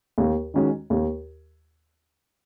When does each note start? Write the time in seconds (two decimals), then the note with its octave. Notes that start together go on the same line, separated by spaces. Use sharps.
0.18 D#2
0.54 D#3 G#3 C#4 F#4
0.90 D#2